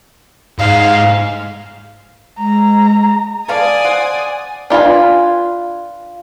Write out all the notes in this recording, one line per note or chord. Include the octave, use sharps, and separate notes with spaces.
G#2 F5
G#3 A#5
A4 B4 D5 F5 G#5 D#6
C5 F5 F#5
D4 F4 B4 G#5